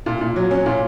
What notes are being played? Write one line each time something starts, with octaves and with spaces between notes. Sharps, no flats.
A#2
A#2
F#3
C#4
A#2